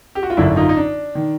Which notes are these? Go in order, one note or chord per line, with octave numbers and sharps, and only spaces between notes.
G4
F#4
F4
G#1 F#2 D3 D4 E4
D#4 F4
D#4
D4
D#3